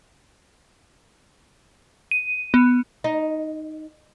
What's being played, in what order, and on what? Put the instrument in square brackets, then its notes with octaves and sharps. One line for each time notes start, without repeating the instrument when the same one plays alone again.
[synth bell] D#7
B3
[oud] D#4